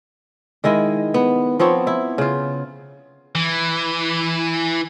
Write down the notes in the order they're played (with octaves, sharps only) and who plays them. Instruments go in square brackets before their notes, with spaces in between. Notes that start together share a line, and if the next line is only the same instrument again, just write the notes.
[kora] D#3 G#3 E4 D#5
B3
F3 B3 C4 C#5
E4
C#3 F4
[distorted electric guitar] E3